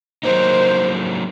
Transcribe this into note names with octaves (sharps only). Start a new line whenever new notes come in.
F#3 A#3 D#4 C5